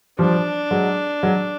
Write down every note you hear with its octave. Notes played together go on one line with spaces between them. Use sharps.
F3 G3 D4
F#3 G#3
F#3 G#3